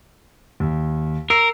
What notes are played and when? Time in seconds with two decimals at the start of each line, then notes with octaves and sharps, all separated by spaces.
0.60 D#2
1.30 A#4 E6 C7 F7